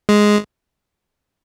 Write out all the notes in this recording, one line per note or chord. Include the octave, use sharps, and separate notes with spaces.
G#3